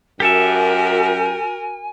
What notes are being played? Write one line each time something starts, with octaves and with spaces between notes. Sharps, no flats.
F#2 F#4 G4 A4 A#4 E5 G#5